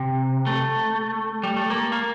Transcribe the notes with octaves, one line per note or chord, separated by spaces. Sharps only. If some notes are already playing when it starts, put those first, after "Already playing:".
Already playing: C3
A3
G3
A3
A#3
A#3